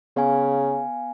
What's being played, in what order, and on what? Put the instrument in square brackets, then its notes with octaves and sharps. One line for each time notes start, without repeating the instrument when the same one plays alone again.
[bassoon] C#3 [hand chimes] B3 F5 G#5